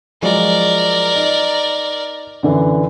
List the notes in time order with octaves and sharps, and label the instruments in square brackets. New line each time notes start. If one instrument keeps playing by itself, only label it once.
[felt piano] F3 F#3 G#3 [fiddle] A#4 D5
[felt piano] D#4
F#2 D3 E3